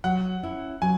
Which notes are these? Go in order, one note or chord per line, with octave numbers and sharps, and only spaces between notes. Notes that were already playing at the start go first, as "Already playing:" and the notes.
F#3 F#5
C#4 E4
F#3 G#5